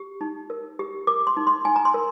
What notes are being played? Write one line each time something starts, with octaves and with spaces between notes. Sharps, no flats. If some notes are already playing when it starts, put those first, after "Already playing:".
Already playing: G4
D#4
A#4
G4
A#4 D6
C6
D#4
C6
D#4 G#5
A#5
C6
A#4